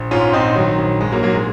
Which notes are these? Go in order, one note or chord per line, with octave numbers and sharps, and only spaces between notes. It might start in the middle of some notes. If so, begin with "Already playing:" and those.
Already playing: A#1
G#2 C#4 F4
A#1 C4 D#4
D#3 F#3
A#1
G#2 G#3
F#3 A#3
A#1 F#3 A#3
G#3